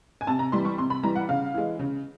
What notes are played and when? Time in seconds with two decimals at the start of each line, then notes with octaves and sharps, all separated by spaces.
0.21 G#5
0.27 C3 A5
0.39 A#5
0.52 E3 G3 C6
0.65 C#6
0.78 C3 C6
0.90 B5
1.03 E3 G3 A#5
1.16 F#5
1.29 C#3 F5
1.54 E3 G#3
1.79 C#3